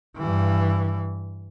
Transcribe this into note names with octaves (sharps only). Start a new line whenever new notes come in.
G2 E3